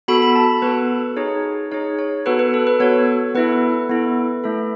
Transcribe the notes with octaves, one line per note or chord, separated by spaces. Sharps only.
B3 F#4 A4 B5
B5
A5
B3 F#4 A4 B4
D#4 G#4 C#5
D#4 G#4 C#5
C#5
B3 F#4 A4 B4
B4
A4
B4
B3 F#4 A4 C#5
B3 E4 A4 B4
B3 E4 A4
A3 E4 A4